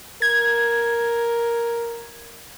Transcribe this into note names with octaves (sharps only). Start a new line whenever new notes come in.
A#4 G#6